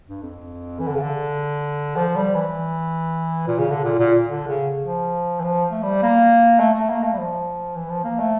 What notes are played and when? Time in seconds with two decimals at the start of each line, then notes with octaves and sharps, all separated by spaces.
0.08 G2
0.22 F2
0.80 E3
0.87 D3
0.95 C#3
1.01 D3
1.96 F3
2.16 G3
2.35 E3
3.47 A#2
3.58 C#3
3.71 D3
3.84 A#2
3.99 A#2
4.28 D3
4.48 C#3
4.85 F3
5.40 E3
5.44 F3
5.71 A3
5.83 G3
6.02 A#3
6.60 A3
6.74 A3
6.90 A#3
7.03 A3
7.13 G3
7.18 F3
7.75 E3
7.90 F3
8.05 A#3
8.19 A3